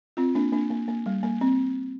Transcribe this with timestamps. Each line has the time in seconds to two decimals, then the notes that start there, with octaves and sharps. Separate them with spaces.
0.17 C4 F4
0.35 A#3 D4
0.52 A#3 D4
0.70 A#3
0.88 A#3
1.06 G3
1.23 A#3
1.41 C4